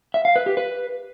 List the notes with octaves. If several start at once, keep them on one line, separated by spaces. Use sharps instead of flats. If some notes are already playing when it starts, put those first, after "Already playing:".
E5
F5
B4
G4
B4